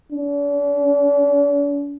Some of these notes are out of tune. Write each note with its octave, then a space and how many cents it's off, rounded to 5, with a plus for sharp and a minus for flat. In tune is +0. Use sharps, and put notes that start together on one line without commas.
D4 -45